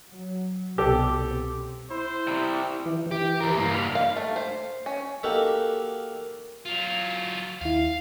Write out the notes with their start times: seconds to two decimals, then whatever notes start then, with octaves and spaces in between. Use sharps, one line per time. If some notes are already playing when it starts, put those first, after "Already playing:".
0.10 F#3
0.78 C2 B2 G4 A4
1.26 C4
1.90 E4 C5
2.28 C3 G3
2.86 E3
3.11 E3 G4
3.41 G4 A#4
3.57 G2 A#3
3.74 B5 F6
3.95 F5
4.16 A3
4.36 C5
4.86 C#4
5.23 A#3 D#4 F#4 G4 A4 A#4
6.65 F#3 F4
7.61 D#2 E4 F5